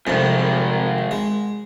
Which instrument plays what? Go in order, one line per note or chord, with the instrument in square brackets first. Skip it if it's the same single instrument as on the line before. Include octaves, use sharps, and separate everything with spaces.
[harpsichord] C2 F2 [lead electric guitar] G#2 D#3
[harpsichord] G#3